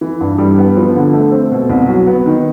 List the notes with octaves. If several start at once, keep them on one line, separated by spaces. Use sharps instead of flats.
E3
G2
G3
B3
F3
D3
A3
C4
B2
C2
F#3
B3
D#3